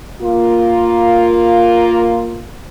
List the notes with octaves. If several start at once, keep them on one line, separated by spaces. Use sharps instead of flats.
A#3 F4